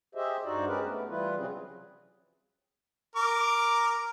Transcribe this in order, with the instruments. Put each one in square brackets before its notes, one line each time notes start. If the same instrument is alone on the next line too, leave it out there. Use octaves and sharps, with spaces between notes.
[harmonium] G4 G#4 C5 D#5 E5
G2 D#4 F#4 C5 D5
G#3 C#4 G4 G#4 A#4 B4
A3 B3
E3 G3 E4 F4 B4
C3 F#3 C4 C#4 G#4
[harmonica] A#4 D6